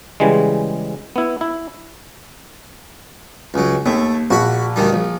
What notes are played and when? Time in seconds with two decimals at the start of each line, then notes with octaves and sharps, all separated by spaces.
0.20 C#3 E3 G3 G#3
1.16 B3 E4
1.41 E4
3.54 C#2 F#3
3.86 D#2 A3
4.30 A#1 F#4 B5
4.76 D2 D#3 G3
4.93 A#1